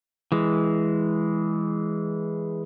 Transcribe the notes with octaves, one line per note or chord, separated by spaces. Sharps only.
E3 G#3